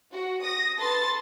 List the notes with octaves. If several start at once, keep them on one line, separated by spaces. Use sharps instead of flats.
F#4
D#6 A#6
A4 B4 A5 C6 A6